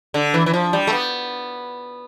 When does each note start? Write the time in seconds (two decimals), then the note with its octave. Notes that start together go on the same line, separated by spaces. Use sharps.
0.14 D3
0.34 E3
0.46 E3
0.54 F3
0.73 G3
0.87 A3
0.93 B3